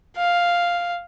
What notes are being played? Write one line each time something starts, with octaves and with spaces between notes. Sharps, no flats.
F5